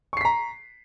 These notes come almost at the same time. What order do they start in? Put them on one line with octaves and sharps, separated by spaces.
C#6 C7 B6 A#5